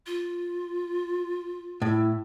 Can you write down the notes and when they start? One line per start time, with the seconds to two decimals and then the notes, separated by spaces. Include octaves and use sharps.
0.06 F4
1.82 A2 E4